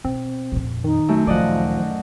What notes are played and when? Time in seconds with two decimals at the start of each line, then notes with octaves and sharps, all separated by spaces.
0.05 B2 C4
0.52 A#1 F2
0.84 D#3 D#4
1.08 F#2 A3
1.27 D2 A#2 F3 D5 D#5 F#5